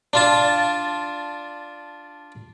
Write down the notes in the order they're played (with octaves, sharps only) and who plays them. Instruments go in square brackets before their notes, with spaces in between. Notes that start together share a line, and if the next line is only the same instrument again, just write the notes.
[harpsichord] D4 F4 A5